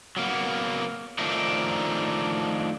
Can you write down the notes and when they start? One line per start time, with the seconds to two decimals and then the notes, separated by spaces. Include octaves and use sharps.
0.17 F#3 A#3 B3
1.19 D#3 F3 A3 D4 D#4